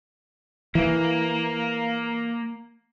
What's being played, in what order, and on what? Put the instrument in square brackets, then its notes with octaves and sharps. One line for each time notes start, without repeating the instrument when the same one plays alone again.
[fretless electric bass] E3 [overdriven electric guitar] A#3